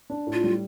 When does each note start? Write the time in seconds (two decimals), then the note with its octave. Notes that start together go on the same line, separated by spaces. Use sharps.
0.10 D4
0.27 A2
0.33 F4
0.44 G3